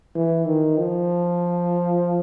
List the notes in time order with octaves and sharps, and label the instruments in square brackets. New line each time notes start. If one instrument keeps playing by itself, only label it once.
[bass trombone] E3
D#3
F3